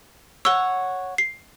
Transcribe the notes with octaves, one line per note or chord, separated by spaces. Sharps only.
C#5 F#5 E6 G7
C7